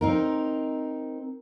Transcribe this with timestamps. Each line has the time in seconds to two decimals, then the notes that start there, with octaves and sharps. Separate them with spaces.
0.01 C4 D#4 A#4